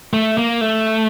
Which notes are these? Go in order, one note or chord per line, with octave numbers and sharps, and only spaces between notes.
A3
A#3
A3